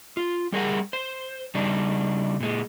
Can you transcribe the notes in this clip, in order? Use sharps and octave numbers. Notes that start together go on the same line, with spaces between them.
F4
G3 G#4 A#4 F#5
C5
C#3 G3 D4 D#4
A#2 G#3